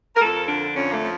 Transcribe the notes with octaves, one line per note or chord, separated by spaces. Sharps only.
A#4
F2 A4
D3 D4
F2 C#4
A#3
A3
F3